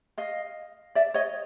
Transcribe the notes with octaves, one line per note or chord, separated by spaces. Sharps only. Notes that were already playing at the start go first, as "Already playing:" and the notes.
D#5 F5
D5 E5
C#5 D#5